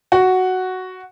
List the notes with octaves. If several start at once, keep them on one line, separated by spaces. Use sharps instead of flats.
F#4